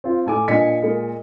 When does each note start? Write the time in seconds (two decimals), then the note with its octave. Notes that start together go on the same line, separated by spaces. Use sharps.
0.04 C4 F4
0.26 A2 A4 G#5 D6
0.48 A#2 D4 D#5 G#5 B6 C#7
0.82 G#3 A#3